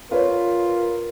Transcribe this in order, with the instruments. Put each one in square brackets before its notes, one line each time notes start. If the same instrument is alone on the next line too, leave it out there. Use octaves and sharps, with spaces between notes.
[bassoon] F4 [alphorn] A#4 [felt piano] B4 C#5